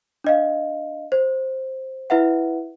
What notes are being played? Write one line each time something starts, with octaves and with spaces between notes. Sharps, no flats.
D4 D#5 F5
C5
E4 B4 E5 F#5